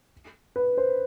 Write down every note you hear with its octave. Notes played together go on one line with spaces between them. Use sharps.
B4
C5